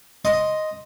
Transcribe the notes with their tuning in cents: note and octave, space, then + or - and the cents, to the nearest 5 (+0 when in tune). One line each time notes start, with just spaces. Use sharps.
D#5 +0 C6 +0